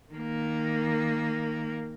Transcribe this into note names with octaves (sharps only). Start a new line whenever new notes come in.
D#3 A#3